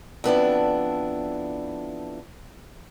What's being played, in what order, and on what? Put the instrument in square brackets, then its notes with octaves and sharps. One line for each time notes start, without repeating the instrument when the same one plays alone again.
[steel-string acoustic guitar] F2 B3 D4 E4